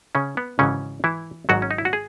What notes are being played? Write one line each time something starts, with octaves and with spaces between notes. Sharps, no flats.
C#3 C#4
B3
G#1 G#2 C#3 E3 C#4
E3 E4
G#1 G#2 D#3 F#3 F#4
C#4
D#4
E4
F#4
G#4